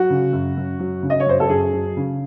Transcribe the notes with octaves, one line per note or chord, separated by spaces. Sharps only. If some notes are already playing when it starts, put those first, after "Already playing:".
Already playing: F#3 F#4
C#3
F#2
F#2
F#3
C#3
D#5
C#5
F#2 C5
A4
F#2 G#4
F#3
C#3